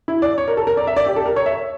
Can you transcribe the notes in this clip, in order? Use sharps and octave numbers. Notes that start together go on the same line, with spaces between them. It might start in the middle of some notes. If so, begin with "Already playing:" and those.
E4
D5
C#5
A#4
A4
A#4
D5
E5
D5
G4
A4
A#4
C#5
E5